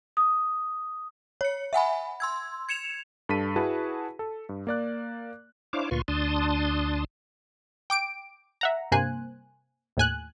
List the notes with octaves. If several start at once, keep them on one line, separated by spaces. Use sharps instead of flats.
D#6
C#5 C#7
E5 F#5 G#5 B5
C6 E6 G#6
G#6 C#7 E7 F7
G2 A4 B6 D#7
E4 F#4 G#4 B4 A5
A4
G2
A#3 D5 F#6
D4 E4 C5 C#5 F5 D6
D2 A#2 F4 B4 C6 C#6
D2 D4 A5 C6 D#6
G5 D6 D7
E5 F#5 A#5
G2 C3 A#3 C5 G#5 F#6
D#2 A2 G#5 F#6